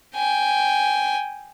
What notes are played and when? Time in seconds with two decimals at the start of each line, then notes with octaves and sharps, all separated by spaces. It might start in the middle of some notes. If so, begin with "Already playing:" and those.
0.16 G5 G#5